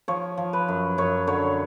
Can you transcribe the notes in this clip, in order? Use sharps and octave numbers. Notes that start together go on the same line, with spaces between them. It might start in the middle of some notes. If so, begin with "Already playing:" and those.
F3 C#5
F3
B4
F#2
F#2 C#5
D3 C#5